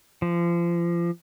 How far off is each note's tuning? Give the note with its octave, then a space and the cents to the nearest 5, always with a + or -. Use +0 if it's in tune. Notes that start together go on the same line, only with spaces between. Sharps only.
F3 -30